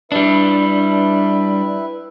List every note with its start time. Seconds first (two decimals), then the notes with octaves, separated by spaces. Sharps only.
0.12 G3 D4 E4 B4 E5